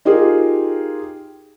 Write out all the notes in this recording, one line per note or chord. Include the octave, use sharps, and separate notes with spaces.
D#4 F4 G4 G#4 A#4